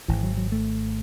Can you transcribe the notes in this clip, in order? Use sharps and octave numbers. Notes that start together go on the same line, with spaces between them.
G#1 G#2 E3
F#3
F#3
A3